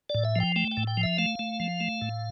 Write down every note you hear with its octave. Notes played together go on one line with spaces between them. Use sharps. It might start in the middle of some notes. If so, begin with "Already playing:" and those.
D5
A2
E5
F3 G5
A3 G5
G5
A2
G5
F3
E5
A3 F5
A3
F3
A3
A2